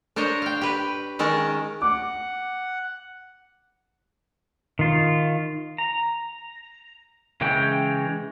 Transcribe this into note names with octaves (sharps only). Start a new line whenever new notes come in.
D4 A#4 C5 C#5 D#5
F5 G5
G4 B4
D#3 G#3 C#4 A#4 A5
F#5 D6
D#3 F4
A#5
C#3 E3 G#3 C#4 G5